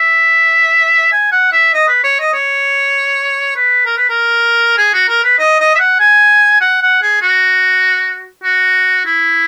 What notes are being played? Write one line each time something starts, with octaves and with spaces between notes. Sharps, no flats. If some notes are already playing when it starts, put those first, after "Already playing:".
Already playing: E5
G#5
F#5
E5
D#5
B4
C#5
D#5
C#5
B4
A#4
B4
A#4
G#4
F#4
A#4
B4
D#5
D#5
E5
F#5
G#5
F#5
F#5
G#4
F#4
F#4
E4